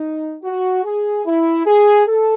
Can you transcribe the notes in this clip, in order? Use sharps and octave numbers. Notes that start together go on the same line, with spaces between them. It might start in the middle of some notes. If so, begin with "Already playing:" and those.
Already playing: D#4
F#4
G#4
E4
G#4
A4